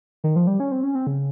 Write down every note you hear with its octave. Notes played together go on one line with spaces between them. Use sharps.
D#3
F3
G3
C#4
C4
C#4
C4
C#3